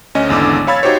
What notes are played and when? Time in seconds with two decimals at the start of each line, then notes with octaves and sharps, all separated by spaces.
0.15 D2 C#4 D#5
0.29 G#1 E2 D3 D6 E6
0.67 C#5 F5 B5 E6 G#6 A6
0.83 D#4 F#4 G4 C5 C#5